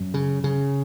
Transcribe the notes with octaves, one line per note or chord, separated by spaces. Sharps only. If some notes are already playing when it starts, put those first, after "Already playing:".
Already playing: F#2
C#3
C#3